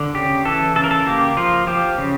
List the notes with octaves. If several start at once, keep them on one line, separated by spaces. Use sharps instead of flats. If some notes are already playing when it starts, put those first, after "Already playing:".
Already playing: D3
C#3 G4
E3 A4
C#3 A4
A#4
A4
A#3 G4
F3 F4
F3 G4
C#3